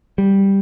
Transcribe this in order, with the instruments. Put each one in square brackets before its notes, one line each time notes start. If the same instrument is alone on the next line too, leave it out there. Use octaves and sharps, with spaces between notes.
[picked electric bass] G3